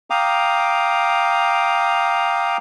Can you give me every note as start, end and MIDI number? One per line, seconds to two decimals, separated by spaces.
0.10 2.57 77
0.10 2.57 79
0.10 2.57 82
0.10 2.57 86
0.10 2.57 87